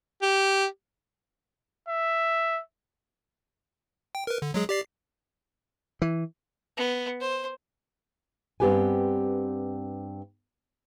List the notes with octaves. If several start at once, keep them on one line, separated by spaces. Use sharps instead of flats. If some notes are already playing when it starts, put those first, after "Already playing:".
G4
E5
G5
A#4 B4
D3
F#3 G#3 G#4
G4 D5 C7
E3
B3
C5
G2 B3 C4 G4 B4 G#5